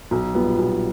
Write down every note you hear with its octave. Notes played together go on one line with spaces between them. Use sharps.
B1
A#2 G3 B3
B1